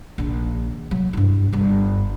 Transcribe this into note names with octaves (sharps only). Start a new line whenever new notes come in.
A#1 D#3
F#3
G2 E4
G1 G2